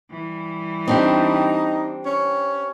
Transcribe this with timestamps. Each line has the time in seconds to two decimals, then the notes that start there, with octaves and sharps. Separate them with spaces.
0.10 E3 G3
0.88 C4 D4 D#4 G4
2.06 C#4